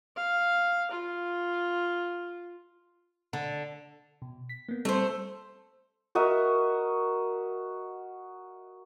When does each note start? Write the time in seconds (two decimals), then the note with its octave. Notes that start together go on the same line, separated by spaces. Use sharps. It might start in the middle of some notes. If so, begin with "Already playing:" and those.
0.16 F5
0.91 F4
3.33 D3
4.22 B2
4.49 B6
4.69 A#3 B3
4.85 G3 A3 C4 C5
6.15 F#4 A#4 D#5 E5